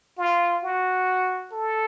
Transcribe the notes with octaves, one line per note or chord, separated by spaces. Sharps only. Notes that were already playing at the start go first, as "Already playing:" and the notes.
F4
F#4
A4